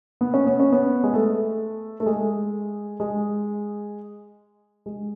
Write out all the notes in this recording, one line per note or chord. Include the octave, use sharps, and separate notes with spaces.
B3
C#4
B3
C#4
B3
G#3
A3
A3
G#3
G#3
G#3